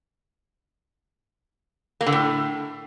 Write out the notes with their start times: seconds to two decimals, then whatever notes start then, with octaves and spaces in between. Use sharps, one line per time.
2.01 A#3
2.07 D3
2.12 A2